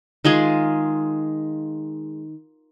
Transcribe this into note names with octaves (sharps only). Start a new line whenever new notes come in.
D#3 G#3 F4 G#4